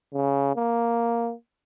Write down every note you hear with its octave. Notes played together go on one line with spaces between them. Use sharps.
C#3
A#3